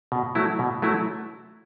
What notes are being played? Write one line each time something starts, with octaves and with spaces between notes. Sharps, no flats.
B2
F#3 A3 E4
B2
F#3 A3 E4